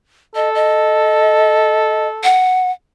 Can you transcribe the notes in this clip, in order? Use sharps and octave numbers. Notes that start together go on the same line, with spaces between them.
A4 D#5
D#5
F#5